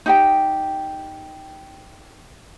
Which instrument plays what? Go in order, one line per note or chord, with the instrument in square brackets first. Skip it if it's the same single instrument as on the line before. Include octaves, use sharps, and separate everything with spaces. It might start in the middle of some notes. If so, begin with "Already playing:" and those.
[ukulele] D#4 G4 G5